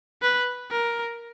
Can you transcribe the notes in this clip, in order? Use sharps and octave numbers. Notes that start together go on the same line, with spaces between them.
B4
A#4